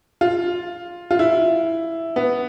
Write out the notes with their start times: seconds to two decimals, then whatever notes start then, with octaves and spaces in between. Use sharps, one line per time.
0.21 F4
1.11 F4
1.19 E4
2.16 B3